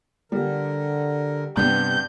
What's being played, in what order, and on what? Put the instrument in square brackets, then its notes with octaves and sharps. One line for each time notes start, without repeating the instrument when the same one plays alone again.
[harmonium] D3 A#4 [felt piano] G3
[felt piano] G2 [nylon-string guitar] C3 B3 [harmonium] G3 [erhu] G6